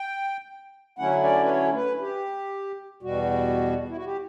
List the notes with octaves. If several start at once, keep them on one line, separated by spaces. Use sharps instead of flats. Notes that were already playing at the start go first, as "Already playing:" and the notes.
Already playing: G5
D3 F#3 A3 C#4 E4 F#5
D5
B4
C#5
B4
G4
E2 B2 G3 F#4
E4
F#4
G4